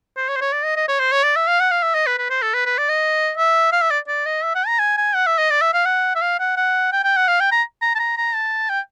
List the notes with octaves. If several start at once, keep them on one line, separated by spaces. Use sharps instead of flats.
C5
C#5
C5
C#5
D5
D#5
D#5
C#5
C5
C#5
D5
E5
F5
F#5
F5
E5
D#5
B4
B4
C5
A4
B4
B4
D5
D#5
E5
F5
E5
D5
D5
D#5
E5
F#5
A#5
G#5
G#5
F#5
E5
D#5
D5
E5
F5
F#5
E5
F5
F#5
F#5
G5
G5
F#5
F5
G5
A#5
A#5
A5
A#5
A#5
A5
G5